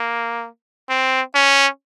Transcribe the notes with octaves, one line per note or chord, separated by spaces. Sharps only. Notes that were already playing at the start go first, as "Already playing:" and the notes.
Already playing: A#3
C4
C#4